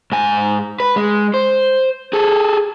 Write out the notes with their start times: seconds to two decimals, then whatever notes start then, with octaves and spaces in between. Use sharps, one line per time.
0.12 G#2 G#5
0.80 B4
0.96 G#3
1.34 C5
2.13 G#4 A4